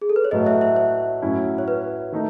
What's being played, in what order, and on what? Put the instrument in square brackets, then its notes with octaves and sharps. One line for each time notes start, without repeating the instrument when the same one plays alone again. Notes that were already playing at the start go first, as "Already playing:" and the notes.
[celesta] G#4
A4
B4
C#5
[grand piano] A2 F#3 A3 [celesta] B4 D#5
[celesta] C#5 E5
C#5 E5
C#5
[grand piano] A2 F#3 C#4 E4
[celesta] C#5
B4
[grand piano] D#3 A3 D#4